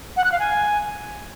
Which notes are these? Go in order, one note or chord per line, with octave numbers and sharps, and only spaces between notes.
F#5
F#6
F5
G#5